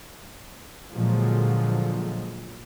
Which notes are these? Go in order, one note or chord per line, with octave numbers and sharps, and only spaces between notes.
A#2 D3 F3 F#3 G#3